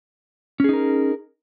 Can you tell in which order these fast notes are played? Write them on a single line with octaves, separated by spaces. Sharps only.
C#4 G#4 D#4 A#4